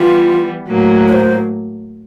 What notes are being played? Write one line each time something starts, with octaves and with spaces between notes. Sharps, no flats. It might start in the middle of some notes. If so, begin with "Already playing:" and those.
Already playing: E3 G3 B3 F4
A2 F#3 A#3
C#5
C5